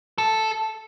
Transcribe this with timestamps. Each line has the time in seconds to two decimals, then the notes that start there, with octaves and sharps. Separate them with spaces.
0.18 A4